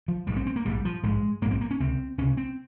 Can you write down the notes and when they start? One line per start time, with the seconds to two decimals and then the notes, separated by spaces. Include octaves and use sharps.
0.08 F3
0.27 A#1 G#2 G3
0.37 C4
0.47 C4
0.56 A#3
0.65 A#1 G#2 G3
0.85 F3
1.03 A#1 G#2 G#3
1.42 G#2 A#3
1.45 A#1
1.51 C4
1.61 A#3
1.71 C#4
1.80 C#2 C3 C4
2.18 C#2 C3 C#4
2.37 C4